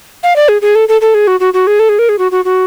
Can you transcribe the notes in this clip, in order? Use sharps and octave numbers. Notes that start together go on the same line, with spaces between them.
F5
D5
G#4
G#4
A4
A4
A4
G#4
F#4
F#4
F#4
G#4
A4
G#4
A#4
G#4
F#4
F#4
F#4